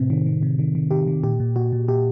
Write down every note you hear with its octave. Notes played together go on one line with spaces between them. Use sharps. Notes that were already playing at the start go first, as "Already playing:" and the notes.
Already playing: A2 C3 C4
D#3
D#3
C3
D#3
D#3
D#3 G4
D#3
A#2 G4
A#2
A#2 F#4
A#2
A#2 G4